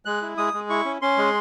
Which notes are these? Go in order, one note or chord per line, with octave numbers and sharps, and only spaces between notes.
G#3 F#6
E4
G#3 D#6
G#3
E4 C#6
C#4
C#4 C6
G#3